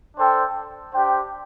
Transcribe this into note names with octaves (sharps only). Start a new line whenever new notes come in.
D4 A4 C5 G5
D4 G4 C5 G5